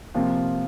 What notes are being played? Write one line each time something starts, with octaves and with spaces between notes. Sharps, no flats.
C3 F3 A#3 F4